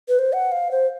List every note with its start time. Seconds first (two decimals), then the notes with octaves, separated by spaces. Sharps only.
0.08 B4
0.19 C5
0.33 F#5
0.52 F5
0.71 C5